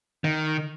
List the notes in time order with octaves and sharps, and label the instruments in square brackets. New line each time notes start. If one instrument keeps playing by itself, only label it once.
[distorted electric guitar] D#3